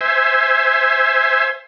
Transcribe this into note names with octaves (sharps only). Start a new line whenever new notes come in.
C5 E5 G#5